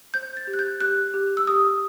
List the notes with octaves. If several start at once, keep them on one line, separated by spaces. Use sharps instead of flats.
C5 G6
A6
G4
F#6
G6
G4 F#6
G4
E6
G4 D#6